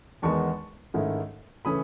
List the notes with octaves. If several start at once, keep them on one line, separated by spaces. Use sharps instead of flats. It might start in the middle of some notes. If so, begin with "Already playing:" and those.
E2 D#3 G#3 B3 A5 C#6
G#2 D#3 A3 C#4 E4
C#3 E3 A3 C#4 B5 D#6